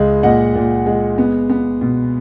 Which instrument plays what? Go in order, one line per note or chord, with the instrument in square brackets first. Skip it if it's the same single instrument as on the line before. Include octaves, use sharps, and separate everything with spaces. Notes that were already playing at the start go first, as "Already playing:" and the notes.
Already playing: [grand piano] C#2 G#3
A#2 D#5 F#5
A#2
G#3
B3
B3
B2